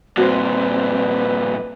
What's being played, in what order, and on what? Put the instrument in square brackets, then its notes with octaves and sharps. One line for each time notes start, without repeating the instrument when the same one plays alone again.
[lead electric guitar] G2 A#2 [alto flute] C4 [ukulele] F#4 C5 [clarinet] B4